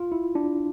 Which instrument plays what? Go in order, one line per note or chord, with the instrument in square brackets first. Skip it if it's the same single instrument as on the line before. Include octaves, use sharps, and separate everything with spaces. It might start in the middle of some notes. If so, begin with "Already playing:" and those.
Already playing: [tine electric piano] F4
E4
D4